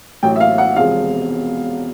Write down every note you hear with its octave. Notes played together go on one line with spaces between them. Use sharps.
A1 A2 F#3 G5
E5
F5
F#5
E1 E2 C3 F3 G#3 F5